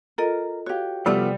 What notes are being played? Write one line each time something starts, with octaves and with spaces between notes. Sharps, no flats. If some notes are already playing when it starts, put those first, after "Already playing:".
F4 A4 A#4 D#5
F#4 G4 C#5 F5
C3 F3 G3 A3 B3